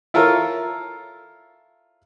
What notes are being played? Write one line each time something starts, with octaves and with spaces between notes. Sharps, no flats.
E4 F4 A4 A#4 C#5